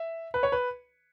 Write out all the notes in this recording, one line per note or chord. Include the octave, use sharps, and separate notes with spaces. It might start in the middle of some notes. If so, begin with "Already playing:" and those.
Already playing: E5
B4
C#5
B4